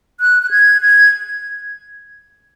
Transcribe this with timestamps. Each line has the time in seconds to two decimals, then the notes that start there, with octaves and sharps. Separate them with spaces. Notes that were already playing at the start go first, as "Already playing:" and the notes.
0.20 F#6
0.43 F#6
0.51 G#6
0.82 G#6